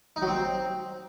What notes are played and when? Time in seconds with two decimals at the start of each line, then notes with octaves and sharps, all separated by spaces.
0.16 D#4
0.22 F#3
0.28 C4